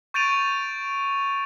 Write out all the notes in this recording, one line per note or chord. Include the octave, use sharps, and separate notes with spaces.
C#6 G6 A6 D7 D#7 F7